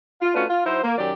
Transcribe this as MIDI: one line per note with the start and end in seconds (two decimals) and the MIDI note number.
0.22 0.33 65
0.35 0.44 57
0.35 0.44 61
0.35 0.44 62
0.35 0.44 65
0.35 0.44 66
0.35 0.44 71
0.49 0.65 65
0.66 0.82 54
0.66 0.82 63
0.66 0.82 64
0.66 0.82 72
0.84 0.95 58
0.98 1.12 42
0.98 1.12 51
0.98 1.12 54
0.98 1.12 67
0.98 1.12 74